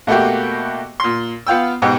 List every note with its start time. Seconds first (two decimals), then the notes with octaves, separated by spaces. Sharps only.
0.07 B2 A3 A#3 F#4 G4
1.00 A#2 C6
1.47 B3 F4 G5 E6
1.82 G#2 B2 G4